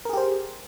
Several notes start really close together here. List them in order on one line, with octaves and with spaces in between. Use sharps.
A#4 G#4 G4 C5